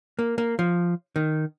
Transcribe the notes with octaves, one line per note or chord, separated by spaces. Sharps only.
A#3
A#3
F3
D#3